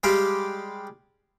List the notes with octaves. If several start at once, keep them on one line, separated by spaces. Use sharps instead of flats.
G3 G#3 G4 F5 G5